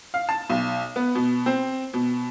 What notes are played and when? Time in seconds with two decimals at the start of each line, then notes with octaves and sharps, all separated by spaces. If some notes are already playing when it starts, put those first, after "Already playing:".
0.14 F5
0.29 A5
0.50 B1
0.96 B3
1.15 B2
1.46 C4
1.94 B2